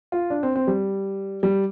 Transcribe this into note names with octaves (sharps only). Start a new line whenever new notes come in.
F4
D4
C4
C4
G3
G3